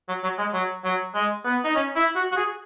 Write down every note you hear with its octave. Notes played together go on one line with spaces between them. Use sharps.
F#3
F#3
G#3
F#3
F#3
G#3
B3
D#4
C#4
E4
F#4
F#4
G#4